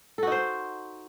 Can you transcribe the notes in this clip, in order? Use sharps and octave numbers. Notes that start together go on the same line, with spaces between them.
D#4 F#4 A4 C5